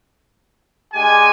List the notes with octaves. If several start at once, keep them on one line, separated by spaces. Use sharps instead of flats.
G#3 D4 G4 G#5